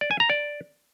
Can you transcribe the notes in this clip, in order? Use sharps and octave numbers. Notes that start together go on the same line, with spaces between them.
D5
G#5
A#5
D5